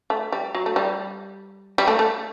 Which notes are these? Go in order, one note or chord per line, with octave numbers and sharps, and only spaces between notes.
A3
G3
F#3
A3
G3
G3
A3
A3